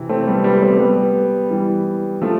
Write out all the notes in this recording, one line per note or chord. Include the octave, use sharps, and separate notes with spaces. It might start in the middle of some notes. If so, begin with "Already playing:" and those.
Already playing: C3 E3
A3 C4
G3 B3
G3 B3
B3
A3 C4
G3 B3
E3 G3
F3 A3